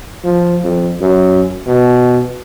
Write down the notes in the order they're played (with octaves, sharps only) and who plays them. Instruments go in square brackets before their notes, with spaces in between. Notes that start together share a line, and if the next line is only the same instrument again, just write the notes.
[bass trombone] F3
F2
F#2
B2